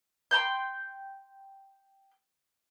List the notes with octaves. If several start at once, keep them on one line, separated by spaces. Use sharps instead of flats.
G5 A#5 C6 G6